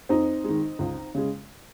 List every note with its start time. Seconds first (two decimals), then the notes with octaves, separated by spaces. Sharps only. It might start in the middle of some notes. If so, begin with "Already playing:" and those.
0.09 F2 C4 D#4
0.44 G#3
0.49 D#3
0.79 C#2
1.15 C#3 G#3